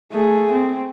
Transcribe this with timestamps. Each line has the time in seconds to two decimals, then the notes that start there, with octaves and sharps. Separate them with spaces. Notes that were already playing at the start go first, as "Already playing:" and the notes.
0.13 A3 G#4
0.52 C4